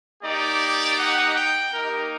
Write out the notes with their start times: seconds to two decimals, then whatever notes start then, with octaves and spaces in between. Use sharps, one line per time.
0.23 A#3 D#4 G4 D5
0.98 F#5
1.35 G5
1.72 A#3 D#4 G4 A#4